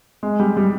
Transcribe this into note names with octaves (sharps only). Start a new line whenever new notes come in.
G#3
G3
G3